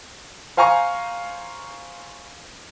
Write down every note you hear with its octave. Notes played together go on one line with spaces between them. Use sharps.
C5 F5 G#5 A#5 C#6